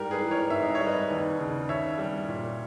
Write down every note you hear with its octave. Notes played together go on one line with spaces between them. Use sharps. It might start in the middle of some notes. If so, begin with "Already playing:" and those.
Already playing: G#2 G3 G4 A#4
G#4 B4
E3
A#4 C#5
G#2 E5
D#5
C#5
G3
B4 D#5
D#2
C#3
D#2 C#5 E5
G3
A#2